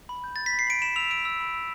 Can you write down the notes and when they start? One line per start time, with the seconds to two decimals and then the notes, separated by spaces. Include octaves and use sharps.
0.09 B5
0.24 G6
0.36 G6 A6
0.46 B6
0.53 B5
0.59 C7
0.67 B5 D7
0.82 B5 E7
0.96 E6 F7
1.10 E6 D7
1.25 E6
1.40 B5
1.55 E6